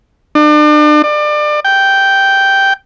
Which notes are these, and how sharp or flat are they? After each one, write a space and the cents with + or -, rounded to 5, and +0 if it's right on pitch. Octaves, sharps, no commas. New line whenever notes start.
D4 +40
D5 +30
G5 -5